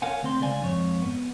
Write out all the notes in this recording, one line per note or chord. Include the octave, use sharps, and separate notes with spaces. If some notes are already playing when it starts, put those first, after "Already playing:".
A#4 C#5 F5 F#5 G#5
D2 C4 C6
C#2 D5 F5 G#5
F2 G#2 C#5
B3